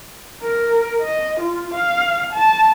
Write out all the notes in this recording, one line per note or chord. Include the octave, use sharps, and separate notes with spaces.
A#4
D#5
F4
F5
A5